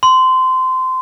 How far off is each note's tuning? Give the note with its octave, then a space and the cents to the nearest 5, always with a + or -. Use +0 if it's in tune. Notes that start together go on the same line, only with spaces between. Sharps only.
C6 -20